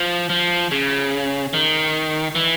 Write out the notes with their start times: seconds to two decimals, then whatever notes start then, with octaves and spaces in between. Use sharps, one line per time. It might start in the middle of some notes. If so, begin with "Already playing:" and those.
Already playing: F3
0.29 F3
0.72 C#3
1.54 D#3
2.35 E3